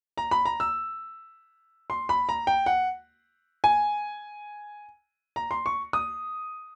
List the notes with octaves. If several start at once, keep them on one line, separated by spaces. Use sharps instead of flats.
A#5
B5
A#5
E6
C6
B5
A#5
G5
F#5
G#5
A#5
C6
C#6
D#6